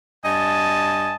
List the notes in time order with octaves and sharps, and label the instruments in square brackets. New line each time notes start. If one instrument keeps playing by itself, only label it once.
[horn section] G2 D#5 G#5 A5